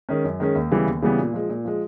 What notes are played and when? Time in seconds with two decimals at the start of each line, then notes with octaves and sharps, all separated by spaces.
0.09 D#3 G#3 C#4
0.24 F#2
0.40 D#3 G#3 C#4
0.55 D#2
0.71 C#3 E3 G3 B3
0.86 D#2
1.02 C#3 E3 G3 B3
1.19 A#2
1.33 F3 G#3
1.49 A#2
1.65 F3 G#3